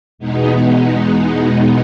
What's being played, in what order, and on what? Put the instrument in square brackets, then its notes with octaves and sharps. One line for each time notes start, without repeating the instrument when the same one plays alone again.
[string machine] E2 B2 G#3 B3 D#4